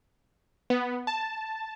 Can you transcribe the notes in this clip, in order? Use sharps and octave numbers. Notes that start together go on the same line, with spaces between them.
B3
A5